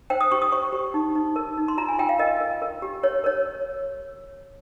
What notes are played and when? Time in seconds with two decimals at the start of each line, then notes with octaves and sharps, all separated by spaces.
0.10 C5 G5
0.21 D#6
0.31 G4 C#6
0.42 D#6
0.52 C5 C#6
0.73 G4
0.94 D#4
1.15 D#4
1.36 A#4
1.57 D#4
1.68 C6
1.78 F4 A#5
1.88 G#5
1.99 F4 G5
2.09 F5
2.19 A#4 D#5
2.40 A#4
2.62 A#4
2.82 G4
3.03 A#4 C#5
3.24 A#4 C#5